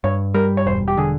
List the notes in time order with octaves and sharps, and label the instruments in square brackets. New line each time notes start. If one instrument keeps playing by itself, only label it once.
[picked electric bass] G2 [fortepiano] C#5
[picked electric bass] G3 [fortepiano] A#4
[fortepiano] C#5
[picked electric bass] E1 [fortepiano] C5
[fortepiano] G4
[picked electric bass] D3 [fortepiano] G#4